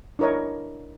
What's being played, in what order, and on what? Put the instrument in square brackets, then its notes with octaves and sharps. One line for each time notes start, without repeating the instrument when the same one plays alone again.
[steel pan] D4 E4 A#4 C#5 D#5